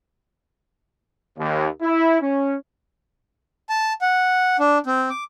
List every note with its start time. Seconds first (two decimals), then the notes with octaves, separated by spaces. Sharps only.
1.37 D#2
1.81 E4
2.21 C#4
3.69 A5
4.01 F#5
4.60 D4
4.86 C4
5.10 D6